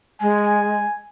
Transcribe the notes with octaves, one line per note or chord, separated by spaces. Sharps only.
G#3 G#5